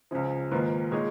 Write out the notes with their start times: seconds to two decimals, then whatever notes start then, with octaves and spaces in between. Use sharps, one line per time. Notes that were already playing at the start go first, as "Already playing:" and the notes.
0.11 C#2 C#3 F3
0.51 G#2 D#3 A#3 F4 B4
0.92 A#2 G#3 D#4 G#4 C#5